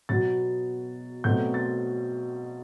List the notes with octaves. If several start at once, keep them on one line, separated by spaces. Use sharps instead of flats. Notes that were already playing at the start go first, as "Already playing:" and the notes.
B2 F#3 B3 A6
B2 F#3 A3 C4 G6
A6